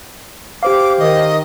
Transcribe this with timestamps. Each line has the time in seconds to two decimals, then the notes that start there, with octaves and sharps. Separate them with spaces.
0.63 G4 C5 F5 D6
0.99 D#3 D#5